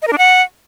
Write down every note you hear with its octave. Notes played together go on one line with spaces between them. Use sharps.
D#5
A#4
D4
F#5